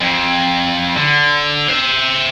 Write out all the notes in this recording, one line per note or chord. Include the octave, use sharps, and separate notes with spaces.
F2
D3
C5 E5